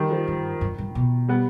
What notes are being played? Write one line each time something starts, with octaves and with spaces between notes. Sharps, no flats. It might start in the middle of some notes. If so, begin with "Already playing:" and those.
Already playing: D#3 G3
F3
G2
G2
G2
B2
G3 B3